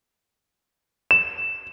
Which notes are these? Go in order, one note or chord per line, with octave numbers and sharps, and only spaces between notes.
E7